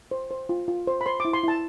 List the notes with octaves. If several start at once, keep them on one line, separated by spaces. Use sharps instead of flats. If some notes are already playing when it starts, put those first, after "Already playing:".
C5
C5
F4
F4
C5
B5
C5 C6
D6
E4
C6
E4 A5